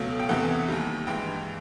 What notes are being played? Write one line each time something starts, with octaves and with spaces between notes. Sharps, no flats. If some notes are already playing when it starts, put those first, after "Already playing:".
Already playing: C#2 B2 F#3 A3 F5
G5
E2 C3 E3 A3 F#5
D#2 D#3 G3
G2 E3 G#3 G5